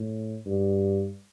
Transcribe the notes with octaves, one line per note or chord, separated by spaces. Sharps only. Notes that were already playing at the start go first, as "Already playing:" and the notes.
Already playing: A2
G2